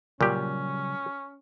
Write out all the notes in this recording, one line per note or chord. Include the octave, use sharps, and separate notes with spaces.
A#2 C#3 F#3 G3 C#4 G4